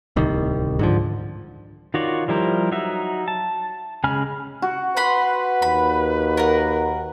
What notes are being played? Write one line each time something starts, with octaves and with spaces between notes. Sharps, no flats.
D1 C2 D#3
G#2 D3 F3
D#3 F4 F#4 C#5 D5
F3 G3 E4 A#4 C5
F#3 D#4 F#4 E5
A5
C#3 G#3 G#5 B5 F6
F#4
B4 F#5 B5 C6
D#2 B5
A#4 F#5